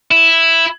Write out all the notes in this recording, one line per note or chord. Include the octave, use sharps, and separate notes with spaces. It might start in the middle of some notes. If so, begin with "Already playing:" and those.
E4